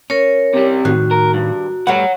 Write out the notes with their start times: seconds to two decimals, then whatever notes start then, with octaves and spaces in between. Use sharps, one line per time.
0.10 C#4 A#4 C#5
0.54 C3 G3
0.85 A2 D#3 F#4
1.11 A#4
1.34 G2
1.87 G3 A3 B4 C#5 F#5